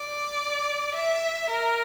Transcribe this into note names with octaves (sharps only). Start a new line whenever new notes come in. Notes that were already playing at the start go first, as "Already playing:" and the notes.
Already playing: D5
E5
A#4